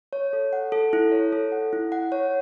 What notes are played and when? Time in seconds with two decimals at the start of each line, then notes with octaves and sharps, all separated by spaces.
0.13 C#5
0.33 A4
0.53 F#5
0.72 A4
0.93 E4
1.12 C#5
1.32 A4
1.52 F#5
1.73 E4
1.92 F#5
2.12 C#5